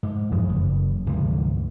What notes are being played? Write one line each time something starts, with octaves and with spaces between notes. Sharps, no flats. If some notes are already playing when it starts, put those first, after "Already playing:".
G#2
F2 A2 E3 G#3
F#1
D2 G#2 C3 E3